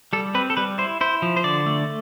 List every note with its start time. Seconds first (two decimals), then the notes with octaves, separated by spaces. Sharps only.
0.13 G3 A4
0.35 C4 B4
0.50 A4
0.57 G3 B4
0.78 E4 C5
1.01 E4 C5
1.22 F3
1.37 C5
1.44 D3 D5
1.66 A3